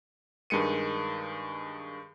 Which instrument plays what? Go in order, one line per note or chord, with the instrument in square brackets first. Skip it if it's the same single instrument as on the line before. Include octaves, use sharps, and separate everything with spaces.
[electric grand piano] G2 D#3 G#3 C#7 D#7